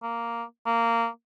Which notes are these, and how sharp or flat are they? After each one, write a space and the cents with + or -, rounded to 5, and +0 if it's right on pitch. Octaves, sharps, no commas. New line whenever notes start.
A#3 +0
A#3 -15